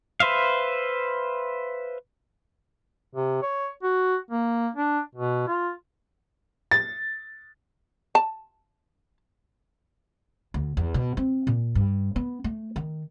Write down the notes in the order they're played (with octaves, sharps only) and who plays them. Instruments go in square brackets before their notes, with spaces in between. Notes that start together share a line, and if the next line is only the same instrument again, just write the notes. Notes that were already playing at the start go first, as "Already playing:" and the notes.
[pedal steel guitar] B4 C5 E5 F5
[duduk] C3
C#5
F#4
A#3
D4
B2
F4
[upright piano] A6
[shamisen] A5
[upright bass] D2
E2
B2
C4
A#2
G2
B3
A3
D#3